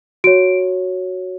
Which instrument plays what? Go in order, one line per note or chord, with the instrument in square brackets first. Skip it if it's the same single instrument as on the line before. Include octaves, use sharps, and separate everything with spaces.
[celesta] F#4 C#5 D7